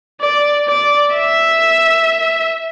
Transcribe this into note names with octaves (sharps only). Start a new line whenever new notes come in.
D5
D5
E5